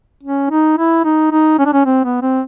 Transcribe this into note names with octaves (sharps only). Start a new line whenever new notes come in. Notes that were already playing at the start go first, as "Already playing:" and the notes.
C#4
D#4
E4
D#4
D#4
C#4
D4
C#4
C4
B3
C4